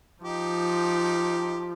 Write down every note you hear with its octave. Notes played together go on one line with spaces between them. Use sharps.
F3 D#4 G4